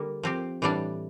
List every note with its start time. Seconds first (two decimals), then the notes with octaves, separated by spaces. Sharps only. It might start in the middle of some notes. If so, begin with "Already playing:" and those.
Already playing: D3 G3 A#3
0.23 F3 C4 G4
0.62 A2 E3 G3 D4